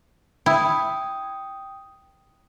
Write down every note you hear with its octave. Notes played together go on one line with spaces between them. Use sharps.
E4 G5 D#6